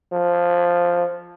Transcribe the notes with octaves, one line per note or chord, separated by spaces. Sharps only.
F3